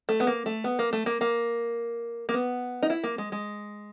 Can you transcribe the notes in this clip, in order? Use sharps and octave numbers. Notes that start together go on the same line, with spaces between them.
A3
B3
A#3
A3
B3
A#3
A3
A#3
A#3
A#3
B3
D#4
E4
A#3
G#3
G#3